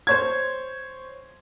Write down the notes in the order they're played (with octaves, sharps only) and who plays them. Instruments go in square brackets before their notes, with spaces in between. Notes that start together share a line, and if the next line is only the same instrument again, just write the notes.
[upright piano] C5 C#5 G#6